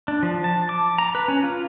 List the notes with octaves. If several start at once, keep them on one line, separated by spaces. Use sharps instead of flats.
D4
F3
A5
D6
A#5
B4
C#4
F4